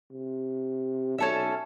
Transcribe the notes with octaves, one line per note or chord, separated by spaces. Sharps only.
C3
B1 C#4 A4 E5